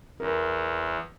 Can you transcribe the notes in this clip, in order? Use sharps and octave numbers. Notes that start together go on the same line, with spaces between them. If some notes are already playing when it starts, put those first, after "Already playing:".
E2 A#4